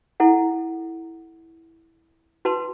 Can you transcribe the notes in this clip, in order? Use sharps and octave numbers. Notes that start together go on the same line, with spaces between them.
E4 A4 F#5
F#4 B4 A5 C6